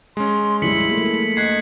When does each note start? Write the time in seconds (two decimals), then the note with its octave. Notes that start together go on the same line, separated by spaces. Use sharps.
0.17 G#3 C#4 C6
0.62 F1 A#1 G3 E4 B6 C#7 F#7
0.91 A3 A#3
1.37 D2 D#5 F#6 G#6 C7